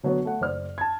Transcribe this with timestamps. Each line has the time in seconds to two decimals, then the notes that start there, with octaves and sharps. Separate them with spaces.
0.03 D3 F#3 B3 F#4 C#5
0.25 A3 F#5
0.41 F#1 C5 D5 F6
0.78 A5 G#6